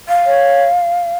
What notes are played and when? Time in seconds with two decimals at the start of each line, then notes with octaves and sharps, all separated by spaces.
0.09 F5
0.26 C#5